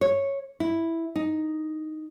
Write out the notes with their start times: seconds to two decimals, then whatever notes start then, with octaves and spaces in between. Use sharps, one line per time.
0.01 C#5
0.60 E4
1.16 D#4